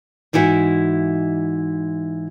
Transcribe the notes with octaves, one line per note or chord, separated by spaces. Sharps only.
G#2 E3 D#4 E4 F#4